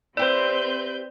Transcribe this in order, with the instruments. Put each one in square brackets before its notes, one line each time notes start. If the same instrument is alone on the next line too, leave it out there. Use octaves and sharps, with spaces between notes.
[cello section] C4 [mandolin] E4 G4 C5 [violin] B4 G6 [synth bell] D5